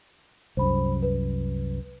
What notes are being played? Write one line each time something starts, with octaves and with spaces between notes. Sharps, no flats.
C2 F#2 C5 B5
B4